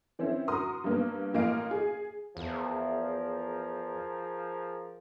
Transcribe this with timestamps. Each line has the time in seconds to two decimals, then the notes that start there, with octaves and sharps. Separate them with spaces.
0.19 E3 C4 C#4 E4
0.48 F#4 A#4 A#5 C6 D#6
0.84 G2 A#3 B3
1.34 A1 A#3 D#5 F5 D7
1.71 G#4
2.37 E2 F3 G#4 A#4